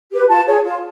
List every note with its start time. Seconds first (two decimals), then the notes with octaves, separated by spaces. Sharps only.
0.10 G4 B4
0.28 F4 A5
0.46 G#4 C#5
0.64 F4